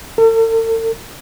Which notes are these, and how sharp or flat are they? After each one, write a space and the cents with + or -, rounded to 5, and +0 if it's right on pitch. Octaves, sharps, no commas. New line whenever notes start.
A4 +45